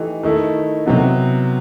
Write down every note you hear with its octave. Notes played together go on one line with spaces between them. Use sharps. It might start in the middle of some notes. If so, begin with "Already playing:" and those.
Already playing: E3 A3 D#4 G4
D#3 A3 E4 A4
C3 F#3 B3